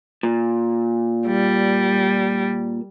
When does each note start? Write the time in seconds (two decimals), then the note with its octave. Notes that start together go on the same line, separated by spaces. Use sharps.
0.23 A#2
1.27 G3